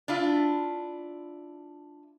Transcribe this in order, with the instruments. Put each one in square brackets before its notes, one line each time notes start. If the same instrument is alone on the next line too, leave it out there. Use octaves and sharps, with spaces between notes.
[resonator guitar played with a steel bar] D4 E4 F4